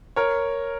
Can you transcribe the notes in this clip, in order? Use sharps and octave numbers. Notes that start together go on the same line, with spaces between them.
A#4 C#5